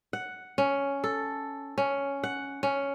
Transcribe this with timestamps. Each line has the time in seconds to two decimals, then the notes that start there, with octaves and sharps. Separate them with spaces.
0.13 F#5
0.58 C#4
1.04 A4
1.78 C#4
2.24 F#5
2.63 C#4